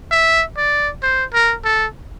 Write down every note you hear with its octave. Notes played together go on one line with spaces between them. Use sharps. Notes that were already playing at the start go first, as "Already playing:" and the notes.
E5
D5
C5
A#4
A4